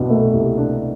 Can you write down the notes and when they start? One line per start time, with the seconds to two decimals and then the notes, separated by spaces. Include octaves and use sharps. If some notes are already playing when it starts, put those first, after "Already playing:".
Already playing: C2 B2 D4
0.10 A3
0.33 C2
0.57 D4